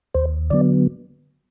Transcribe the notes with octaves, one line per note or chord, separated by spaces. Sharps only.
D#2 C5
D3 F#3 B3 D5